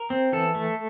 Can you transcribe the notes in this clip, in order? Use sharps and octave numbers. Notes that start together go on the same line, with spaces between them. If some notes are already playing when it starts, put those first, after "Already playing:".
Already playing: A#4
C4
E3 A4
A3